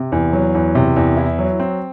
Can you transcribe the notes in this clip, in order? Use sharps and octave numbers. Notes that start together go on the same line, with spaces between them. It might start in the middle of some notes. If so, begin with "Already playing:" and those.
Already playing: C3
E2
F#3
E2
C3
E2
E4
F#3
C4